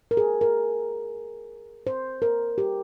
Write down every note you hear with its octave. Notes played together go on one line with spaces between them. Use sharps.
A#4
G#4
A#4
C5
A#4
G4